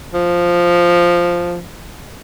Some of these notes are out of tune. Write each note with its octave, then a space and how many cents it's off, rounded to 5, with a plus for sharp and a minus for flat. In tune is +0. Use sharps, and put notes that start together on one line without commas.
F3 +0